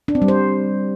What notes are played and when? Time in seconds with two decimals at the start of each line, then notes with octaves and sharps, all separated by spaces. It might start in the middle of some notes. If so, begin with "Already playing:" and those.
0.08 D4
0.15 C4
0.22 G3
0.28 C5